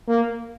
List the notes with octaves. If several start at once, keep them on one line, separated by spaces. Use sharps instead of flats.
A#3